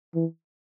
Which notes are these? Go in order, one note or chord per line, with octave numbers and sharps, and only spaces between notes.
E3